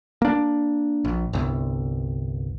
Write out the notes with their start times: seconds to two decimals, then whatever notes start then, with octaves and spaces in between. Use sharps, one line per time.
0.22 A#3 D4
1.05 A#1
1.33 G1 C2